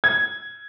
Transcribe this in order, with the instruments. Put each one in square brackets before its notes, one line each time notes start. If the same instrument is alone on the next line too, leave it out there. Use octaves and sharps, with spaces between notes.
[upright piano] G#6